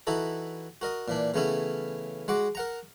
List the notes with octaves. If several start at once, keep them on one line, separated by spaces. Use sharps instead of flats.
E3 D#4 E4 F#4 A4
F#4 A#4 D#5
A#2 E3 D4
C#3 E3 A3 B3 C#4 E4
G#3 F#4 F#5 D6
A#4 F#5 A#5